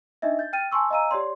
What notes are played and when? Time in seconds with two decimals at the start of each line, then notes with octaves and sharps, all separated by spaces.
0.22 D4 D#4 D#5 E5
0.39 G6 A6
0.53 G5 F6 A6 D#7
0.71 G#5 A5 C6 C#6 E6
0.90 D#5 F5 G#5 A#5 E6 D#7
1.11 G4 C#5 D5 C6